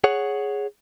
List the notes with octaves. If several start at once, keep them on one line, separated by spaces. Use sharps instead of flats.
G#4 C#5 F#5